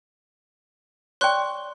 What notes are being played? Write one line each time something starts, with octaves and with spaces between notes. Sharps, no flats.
C#5 D5 G5 C6 C#6 F#6